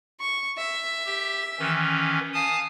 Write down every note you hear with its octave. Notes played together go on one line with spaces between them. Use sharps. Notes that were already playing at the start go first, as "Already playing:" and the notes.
C#6
E5
G4
D#3 E3 C#4
F5 G#5 A5 D#6